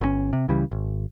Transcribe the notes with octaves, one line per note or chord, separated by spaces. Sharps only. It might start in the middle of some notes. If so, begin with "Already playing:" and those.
G1 B2 C#4
C3
C#2 C#3 E3 G3
G#1